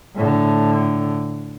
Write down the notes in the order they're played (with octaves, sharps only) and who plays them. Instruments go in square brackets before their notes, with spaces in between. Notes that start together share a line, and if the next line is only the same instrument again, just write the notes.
[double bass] A2 D3